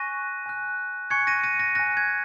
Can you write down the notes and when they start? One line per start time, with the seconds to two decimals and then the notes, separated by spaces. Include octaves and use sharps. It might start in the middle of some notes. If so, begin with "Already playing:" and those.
Already playing: G#5 C#6 F#6 A#6 D#7
0.46 G#5 F#6
1.10 G#5 C#6 F#6 G#6 C#7
1.27 A#6 D#7
1.44 A#6 D#7
1.59 A#6
1.75 G#5 F#6 A#6
1.97 G#6